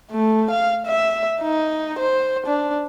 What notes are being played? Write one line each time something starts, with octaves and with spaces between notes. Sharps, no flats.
A3
F5
E5
D#4
C5
D4